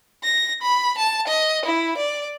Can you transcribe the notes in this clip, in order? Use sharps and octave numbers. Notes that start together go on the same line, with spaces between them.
A#6
B5
A5
D#5
E4
D5